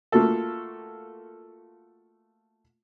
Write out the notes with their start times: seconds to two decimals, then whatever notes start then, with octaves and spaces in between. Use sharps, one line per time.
0.12 A3 A#3 F4 F#4 A4